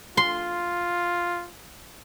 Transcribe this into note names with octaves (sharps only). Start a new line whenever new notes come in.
F4 C6